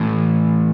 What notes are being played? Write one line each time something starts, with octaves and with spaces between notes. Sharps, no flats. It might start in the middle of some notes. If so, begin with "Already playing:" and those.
Already playing: A2 E3